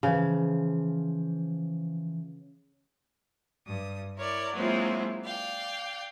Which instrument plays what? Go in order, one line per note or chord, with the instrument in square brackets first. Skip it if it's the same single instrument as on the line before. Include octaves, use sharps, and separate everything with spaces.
[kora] C#3 [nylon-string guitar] E3 F3 F5
[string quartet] G2 D#6
E4 A#4 C#5 D5
F#3 G#3 A#3 C4 E4 F4
D5 F5 G5